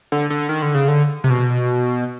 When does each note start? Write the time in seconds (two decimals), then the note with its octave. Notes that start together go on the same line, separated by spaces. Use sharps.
0.12 D3
0.30 D3
0.49 D#3
0.62 D3
0.74 C#3
0.88 D3
1.24 C3
1.30 B2